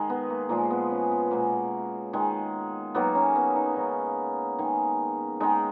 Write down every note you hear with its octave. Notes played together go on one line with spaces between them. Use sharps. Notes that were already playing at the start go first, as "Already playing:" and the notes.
Already playing: D#3 G#3
B3
A#3
A#2 F3 G#3 A#3
B3
C#4
B3
B2 G#3 A#3
D#3 G#3
D#3 F#3 A#3 B3
C#4
B3
D#4
C#3 G#3 D#4
D#3 G#3
D#3 G#3 D#4